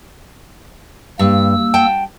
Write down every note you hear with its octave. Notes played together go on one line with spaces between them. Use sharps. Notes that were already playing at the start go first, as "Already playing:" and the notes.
G2 A#3 E6
F#5 G5 A5